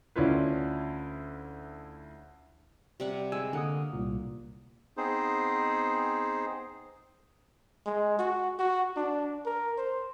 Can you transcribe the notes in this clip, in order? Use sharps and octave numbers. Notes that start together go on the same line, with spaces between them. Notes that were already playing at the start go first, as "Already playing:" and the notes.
D2 C#4 D4 E4 F4 B4
C3 G3 F#5
G#3 G#5 E6
D3 A#3 F#5 D#6
C2 A#2
B3 C4 D#4 G#4 C5
G#3
F#4
F#4
D4
A#4
C5